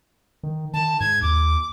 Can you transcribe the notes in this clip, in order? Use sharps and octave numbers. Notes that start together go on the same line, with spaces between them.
D#3
D#3 A5
G#2 G#6
D#2 D6